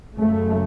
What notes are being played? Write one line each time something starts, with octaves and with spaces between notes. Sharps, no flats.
F#2 C#3 A3